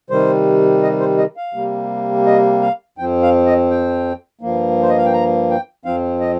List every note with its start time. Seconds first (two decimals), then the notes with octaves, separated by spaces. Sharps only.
0.10 C3 D#3 G3 C5
0.83 D#5
1.00 C5
1.18 D#5
1.37 F5
1.54 C3 G3 A#3
2.27 D#5
2.61 F5
2.98 F2 F3 C4 G5
3.22 F5
3.46 D#5
3.70 G5
4.41 G2 F3 A#3
4.82 C5
4.89 D#5
4.98 F5
5.05 G5
5.13 A#5
5.50 G5
5.85 F2 F3 C4 F5
6.21 D#5